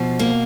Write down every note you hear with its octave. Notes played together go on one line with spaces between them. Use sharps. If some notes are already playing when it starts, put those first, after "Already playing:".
Already playing: B2 F3
A#3